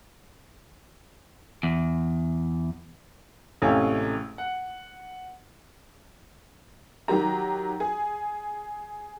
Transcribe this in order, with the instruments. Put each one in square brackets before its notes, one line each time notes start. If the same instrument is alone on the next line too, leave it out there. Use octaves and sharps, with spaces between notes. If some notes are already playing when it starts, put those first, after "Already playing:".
[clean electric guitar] E2
[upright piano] A1 C3 G#3 A3 C#4 F5
F#5
[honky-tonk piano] D#3 F#3 G4 A#5
G#4